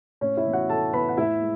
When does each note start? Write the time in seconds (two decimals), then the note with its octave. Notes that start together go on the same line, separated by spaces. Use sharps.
0.21 A2 C#4 C#5
0.37 E4 E5
0.46 E3 B3
0.53 F#4 F#5
0.69 A2 A4 A5
0.93 E3 B3 B4 B5
1.09 F#5
1.17 A2 E4 E5
1.41 G#3